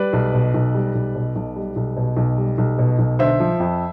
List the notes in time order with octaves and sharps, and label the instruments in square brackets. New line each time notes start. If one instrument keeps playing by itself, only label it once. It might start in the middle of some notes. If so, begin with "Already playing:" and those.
Already playing: [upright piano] G3 B4 D5
B1
B2
B1
G3
B1
B2
B1
G3
B1
B2
B1
G3
B1
B2
B1
D3 C5 E5
F3
F2